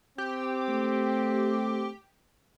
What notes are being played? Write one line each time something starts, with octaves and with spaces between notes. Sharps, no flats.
C4 G4
A3